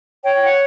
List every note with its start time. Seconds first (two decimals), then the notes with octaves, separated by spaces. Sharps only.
0.24 C#5 G5
0.45 F#5